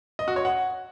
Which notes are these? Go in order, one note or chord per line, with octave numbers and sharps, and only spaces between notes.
D#5
F#4
C#5
F#5